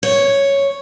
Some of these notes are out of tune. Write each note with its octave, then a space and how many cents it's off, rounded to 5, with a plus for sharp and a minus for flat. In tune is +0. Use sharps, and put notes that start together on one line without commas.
C#5 +0